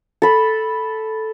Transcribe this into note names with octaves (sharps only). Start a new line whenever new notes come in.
A4 B5